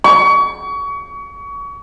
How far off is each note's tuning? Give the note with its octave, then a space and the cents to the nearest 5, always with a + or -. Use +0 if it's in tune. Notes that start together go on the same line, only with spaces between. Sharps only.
C#6 +30